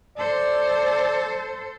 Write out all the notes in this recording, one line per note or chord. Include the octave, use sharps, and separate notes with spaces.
A4 C5 D5